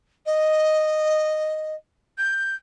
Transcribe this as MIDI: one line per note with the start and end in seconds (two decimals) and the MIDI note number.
0.26 1.75 75
2.18 2.55 91